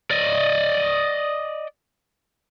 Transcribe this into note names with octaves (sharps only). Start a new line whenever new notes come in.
D5 D#5